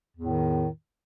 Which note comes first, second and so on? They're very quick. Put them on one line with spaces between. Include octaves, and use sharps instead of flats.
E2 A2 D#3